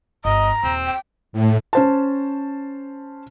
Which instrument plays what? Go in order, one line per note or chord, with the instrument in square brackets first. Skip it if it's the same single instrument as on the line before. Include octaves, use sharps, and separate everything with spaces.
[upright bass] G1 [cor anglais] D#5 [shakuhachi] A#5
[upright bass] D#1 [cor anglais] C4
[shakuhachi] G5
[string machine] A2
[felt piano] C#4 C5 A5